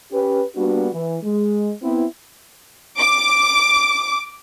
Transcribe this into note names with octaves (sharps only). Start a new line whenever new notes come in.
C#4 G4 B4
G3 A#3 B3 D4 F#4
E3
G#3
B3 C4 E4
D6